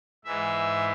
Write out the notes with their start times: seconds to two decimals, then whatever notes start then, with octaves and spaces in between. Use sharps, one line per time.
0.25 G#2 E3 G#3 E5